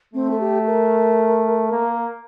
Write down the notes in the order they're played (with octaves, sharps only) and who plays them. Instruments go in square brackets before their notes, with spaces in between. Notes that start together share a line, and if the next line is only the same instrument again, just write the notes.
[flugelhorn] A3 [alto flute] C4
[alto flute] A4
G4
A#4
[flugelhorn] A#3